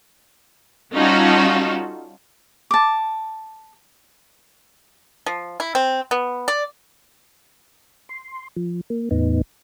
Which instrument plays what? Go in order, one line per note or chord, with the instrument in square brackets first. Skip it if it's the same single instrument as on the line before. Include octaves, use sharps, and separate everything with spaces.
[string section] G3 C#4 D#4 F4 F#4 A4
[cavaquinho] A5 D6
[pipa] F3
E4
C4
B3
D5
[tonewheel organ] C6
F3
A#3
E2 A2 B3 D#4